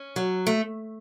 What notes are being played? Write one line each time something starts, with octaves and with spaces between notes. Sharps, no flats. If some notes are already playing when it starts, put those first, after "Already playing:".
Already playing: C#4
F#3
A3